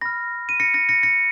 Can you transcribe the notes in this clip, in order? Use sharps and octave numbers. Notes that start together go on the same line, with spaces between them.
B5 F6 A#6
D#7
A#6 C#7
A#6 C#7
A#6 C#7
A#6 C#7